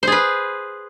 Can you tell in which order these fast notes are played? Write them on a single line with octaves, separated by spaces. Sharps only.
C5 G#4 B4